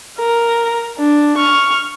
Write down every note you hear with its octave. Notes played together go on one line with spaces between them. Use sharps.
A#4
D4
C#6 F6